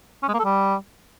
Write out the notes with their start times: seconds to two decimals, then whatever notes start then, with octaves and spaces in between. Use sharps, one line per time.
0.23 C#4
0.28 G#3
0.34 A#3
0.39 A4
0.45 G3